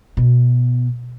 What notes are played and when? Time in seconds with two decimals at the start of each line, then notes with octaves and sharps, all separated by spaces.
0.17 B2